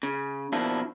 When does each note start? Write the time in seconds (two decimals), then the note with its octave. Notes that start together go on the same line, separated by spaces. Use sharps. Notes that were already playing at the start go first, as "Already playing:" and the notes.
0.03 C#3
0.52 B2 D#3 F3 A#3 D4 E4